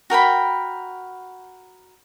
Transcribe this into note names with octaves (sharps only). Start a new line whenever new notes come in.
F#4 A#4 G5 B5